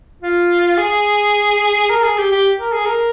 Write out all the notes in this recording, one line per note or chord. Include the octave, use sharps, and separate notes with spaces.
F4
G#4
A#4
G#4
G4
G4
A#4
G#4
A#4